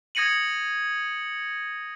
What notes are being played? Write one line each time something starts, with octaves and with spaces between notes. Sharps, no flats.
D#6 G#6 A#6 C#7 D#7 F#7